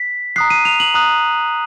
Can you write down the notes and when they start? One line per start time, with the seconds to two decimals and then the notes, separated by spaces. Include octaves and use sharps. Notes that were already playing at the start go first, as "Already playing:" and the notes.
Already playing: B6
0.36 A#5 D#6 F#6 C7
0.50 D#7
0.65 F7
0.80 F#7
0.94 A#5 D#6 F#6